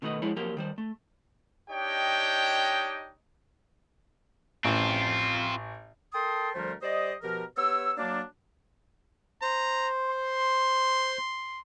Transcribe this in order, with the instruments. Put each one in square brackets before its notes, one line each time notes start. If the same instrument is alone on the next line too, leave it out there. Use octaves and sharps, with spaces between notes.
[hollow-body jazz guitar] B2 D#3 A3 B3 D#5
F3 G#3 E4 C#5
F3 F#3 A#3 G4 A#4
D#3 G3 C5
A3
[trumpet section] D4 D#4 G4 C#5 D#5 G5
[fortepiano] A1 [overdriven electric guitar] C4 F4
[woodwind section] A4 A#4 G5 A5 C6 D#6
D2 F3 G3 A3 A#4 C5
G3 C5 D5 D#5
B2 F3 G4 A#4
B3 G4 C#5 E6
F#3 A#3 D4
[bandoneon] C5 [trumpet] A#5
[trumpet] C6